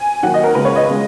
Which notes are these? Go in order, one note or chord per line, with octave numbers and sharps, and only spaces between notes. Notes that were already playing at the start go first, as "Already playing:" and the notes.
Already playing: G#5
D#2 D#3 F#3 F#5
D#5
A#4
C#2 C#3 G#3 B4
C#5
D#5
C#3 G#3